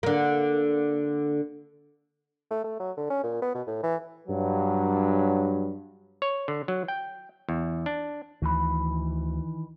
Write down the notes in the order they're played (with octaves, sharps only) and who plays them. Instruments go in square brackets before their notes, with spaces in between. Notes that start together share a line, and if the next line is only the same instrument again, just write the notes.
[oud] D3 A#3
[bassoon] A3
A3
F#3
D3
C#4
A#2
B3
B2
A2
E3
[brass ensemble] G2 F#3
[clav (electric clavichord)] C#5
D3
F#3
G5
E2
D4
[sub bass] D2 [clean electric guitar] D#3 E3 B5